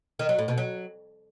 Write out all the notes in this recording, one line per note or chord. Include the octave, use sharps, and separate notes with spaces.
D#3
F#3
A2
B2
F#3